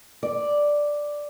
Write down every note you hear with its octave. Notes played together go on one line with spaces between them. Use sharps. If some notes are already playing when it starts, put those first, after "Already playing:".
D5